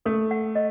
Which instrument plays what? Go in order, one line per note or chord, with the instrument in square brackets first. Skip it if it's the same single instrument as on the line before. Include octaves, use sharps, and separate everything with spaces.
[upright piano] A3 [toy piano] A4
[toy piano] F#5
D#5